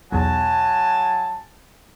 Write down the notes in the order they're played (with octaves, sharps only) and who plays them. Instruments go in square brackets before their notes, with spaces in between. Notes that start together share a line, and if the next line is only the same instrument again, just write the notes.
[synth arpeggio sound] B1 E2 [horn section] F#3 G#5 A5